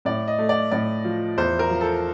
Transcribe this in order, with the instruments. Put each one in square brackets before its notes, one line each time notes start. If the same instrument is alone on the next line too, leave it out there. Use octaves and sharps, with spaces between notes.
[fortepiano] A2 [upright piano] D5
[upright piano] D#5
[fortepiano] A3
[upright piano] D5
[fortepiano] A2 [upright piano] D5
[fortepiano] F3
[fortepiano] E2 [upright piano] C5
[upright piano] A#4
[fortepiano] F3
[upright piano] A4